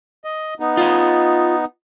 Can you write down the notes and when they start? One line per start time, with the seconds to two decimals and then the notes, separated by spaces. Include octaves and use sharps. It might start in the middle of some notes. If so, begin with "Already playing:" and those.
0.24 D#5
0.60 B3 D#4
0.77 F4 D#5